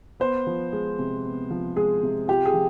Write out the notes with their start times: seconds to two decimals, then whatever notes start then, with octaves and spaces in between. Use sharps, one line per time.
0.20 B3 C5
0.47 F3
0.72 G#3
0.99 C3
1.25 B3
1.50 F3
1.76 G#3 G#4
2.03 C3
2.28 F4 G4
2.45 G#4
2.54 F3